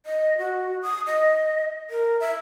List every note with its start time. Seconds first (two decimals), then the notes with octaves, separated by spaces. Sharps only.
0.06 D#5
0.38 F#4
0.82 D#6
1.07 D#5
1.90 A#4
2.20 E5